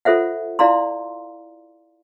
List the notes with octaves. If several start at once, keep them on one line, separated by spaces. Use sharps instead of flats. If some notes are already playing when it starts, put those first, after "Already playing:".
F4 A4 C5 E5 F#5
E4 D5 F5 A#5 C6